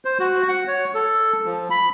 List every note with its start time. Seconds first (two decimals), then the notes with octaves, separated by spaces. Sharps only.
0.05 C5
0.19 F#4
0.49 F#5
0.67 C#5
0.95 A4
1.45 F3
1.70 B5